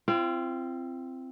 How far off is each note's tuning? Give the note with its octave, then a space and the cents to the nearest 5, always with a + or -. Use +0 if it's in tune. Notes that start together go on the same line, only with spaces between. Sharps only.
C4 +0 F4 -40